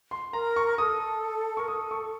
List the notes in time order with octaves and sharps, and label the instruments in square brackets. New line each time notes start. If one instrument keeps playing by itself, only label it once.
[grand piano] C6
[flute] A#4 [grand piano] A#5
[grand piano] C#6
[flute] A4 [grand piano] D#6
[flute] A#4 [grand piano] C#6
[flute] A4 [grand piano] D#6
[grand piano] C#6